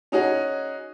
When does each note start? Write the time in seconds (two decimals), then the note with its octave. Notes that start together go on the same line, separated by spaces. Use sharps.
0.12 C#4 D#4 F#4 G#4